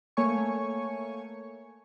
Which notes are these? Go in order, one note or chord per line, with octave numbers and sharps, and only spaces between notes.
A3 A#3 C#5 G#5 C#6